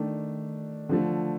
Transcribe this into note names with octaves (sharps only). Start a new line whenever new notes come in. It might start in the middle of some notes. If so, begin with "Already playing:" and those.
Already playing: D#3 A3 D4
D3 F3 A3